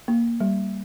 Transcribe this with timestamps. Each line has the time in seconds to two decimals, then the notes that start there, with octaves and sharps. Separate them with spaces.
0.08 A#3
0.40 G3